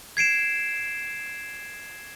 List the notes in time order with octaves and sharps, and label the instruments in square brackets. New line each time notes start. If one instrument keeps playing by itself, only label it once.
[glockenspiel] G#6 C7 D7 E7